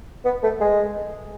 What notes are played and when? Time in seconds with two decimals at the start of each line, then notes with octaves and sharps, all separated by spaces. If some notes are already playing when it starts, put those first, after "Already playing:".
0.25 B3
0.43 A3
0.60 G#3